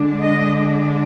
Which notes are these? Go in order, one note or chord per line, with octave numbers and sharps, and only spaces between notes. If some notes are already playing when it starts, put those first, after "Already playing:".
Already playing: D3 G#3 D4
D#5